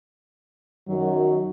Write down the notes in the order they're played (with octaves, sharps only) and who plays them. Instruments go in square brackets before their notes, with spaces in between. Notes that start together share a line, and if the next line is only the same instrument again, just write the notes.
[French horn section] F#2 D#3 F#3